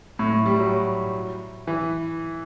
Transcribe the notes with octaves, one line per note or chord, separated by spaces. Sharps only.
A2
A2
G3
F#3
E3